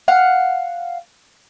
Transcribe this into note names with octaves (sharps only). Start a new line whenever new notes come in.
F5 F#5